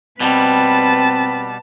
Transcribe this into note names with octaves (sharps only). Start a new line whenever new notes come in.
B2 G3 C4 B4 A5